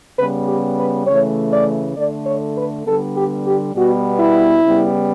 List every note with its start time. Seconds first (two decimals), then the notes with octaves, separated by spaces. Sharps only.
0.18 C#3 G3 B3 B4
0.48 G4
0.78 B4
1.07 C#3 E3 A3 C#5
1.52 D5
1.96 D3 A3 D5
2.25 C#5
2.56 B4
2.85 D3 G3 B3 A4
3.16 G4
3.45 G4
3.74 B2 G3 B3 F#4
4.20 E4
4.64 C#3 G3 B3